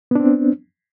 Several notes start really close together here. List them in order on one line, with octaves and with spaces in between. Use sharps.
B3 D4 C4